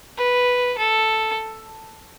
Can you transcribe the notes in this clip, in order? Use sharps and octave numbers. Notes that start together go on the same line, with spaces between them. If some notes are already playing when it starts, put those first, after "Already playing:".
B4
A4